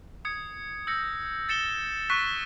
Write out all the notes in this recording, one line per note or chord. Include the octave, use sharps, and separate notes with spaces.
D#6 G#6 C#7
E6 G6 A#6 C#7
A6 C#7 E7 G7
C#6 F#6 B6